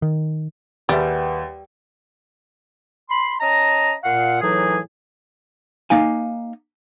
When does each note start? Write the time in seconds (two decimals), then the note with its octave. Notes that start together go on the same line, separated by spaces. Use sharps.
0.02 D#3
0.89 D#2 G3 G#4 B4 E5 F#5 G5
3.09 B5 C6
3.40 C#4 D#5 A5 A#5
4.04 A#2 F5 F#5
4.41 A2 E3 F#3 D#4 G#4
5.90 A#3 D#4 F5 G#5